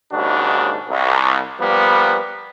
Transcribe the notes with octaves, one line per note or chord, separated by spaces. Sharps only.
D#2 G#2 C#3 D4 F#4
C2
F3 G3 A#3 B3